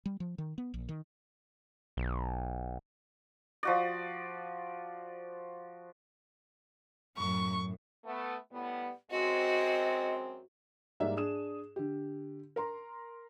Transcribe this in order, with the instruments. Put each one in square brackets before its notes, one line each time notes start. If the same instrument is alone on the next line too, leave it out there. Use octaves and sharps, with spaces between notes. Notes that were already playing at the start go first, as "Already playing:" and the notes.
[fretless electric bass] G3
F3
D#3
B3
A#1
D#3
[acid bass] B1
[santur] F3 F#4 D5
[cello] F#2 A2 [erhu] C#6
[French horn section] A3 B3
A2 G3 B3
[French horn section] F#2 G#3 C4 [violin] F#4 [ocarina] D#5
[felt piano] G#2 G3 A#3 D5 E5
D4 G#4 D#6 E7
D3 G4
A#4 A#5 C6